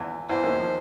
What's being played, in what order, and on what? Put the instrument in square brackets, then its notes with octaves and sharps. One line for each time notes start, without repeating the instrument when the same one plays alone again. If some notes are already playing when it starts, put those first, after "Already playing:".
Already playing: [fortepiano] E2 E3
[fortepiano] E2 E3 [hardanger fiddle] C5
[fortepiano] D#2 D#3
F3